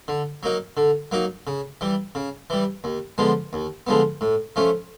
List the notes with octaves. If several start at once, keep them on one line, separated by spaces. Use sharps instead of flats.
D3
F#3 A#3 D#4
D3
F#3 A#3 D#4
C#3
E3 G3
C#3
E3 G3
D#2
D3 F3 G#3 B3
D#2
D3 F3 G#3 B3
A2
F3 A3 C#4